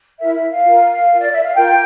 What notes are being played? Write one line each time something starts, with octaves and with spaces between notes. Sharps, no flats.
E4 A#4 E5
E5
F5
F4 A#4
F4 A#4
D5
E5
F5
F4 A#4 G5